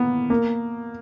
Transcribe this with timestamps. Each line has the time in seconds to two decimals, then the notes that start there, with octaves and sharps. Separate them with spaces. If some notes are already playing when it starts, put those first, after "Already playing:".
Already playing: A#3 B3
0.30 A#3